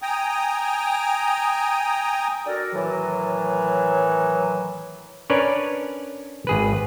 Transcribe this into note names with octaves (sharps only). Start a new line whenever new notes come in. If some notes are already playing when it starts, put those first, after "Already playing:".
G5 G#5 A#5 D#6
D4 F#4 A4 A#4 D5
A2 D#3 E3 F#3
C#4 D4 A#4 B4 C#5 D5
G#1 G#4 B4